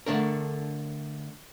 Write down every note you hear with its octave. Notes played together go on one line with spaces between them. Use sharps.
D3 A3 D4 A#4